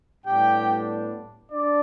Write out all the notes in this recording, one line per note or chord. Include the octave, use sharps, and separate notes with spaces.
A2 G3 B3 D4 G4 G5
D4 D5